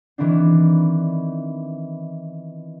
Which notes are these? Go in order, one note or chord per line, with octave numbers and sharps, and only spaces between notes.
D#3 E3 B3 C4 D4